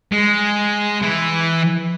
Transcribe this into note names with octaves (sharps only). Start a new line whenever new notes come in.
G#3
E3